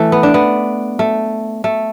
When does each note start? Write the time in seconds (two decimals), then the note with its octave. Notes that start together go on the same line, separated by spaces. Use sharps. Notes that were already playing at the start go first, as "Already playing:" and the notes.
Already playing: E3 A3
0.12 B3
0.23 D4
0.34 B3
0.99 A3
1.64 A3